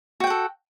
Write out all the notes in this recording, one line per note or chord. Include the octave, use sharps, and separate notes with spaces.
F#4 A4 F#5 G5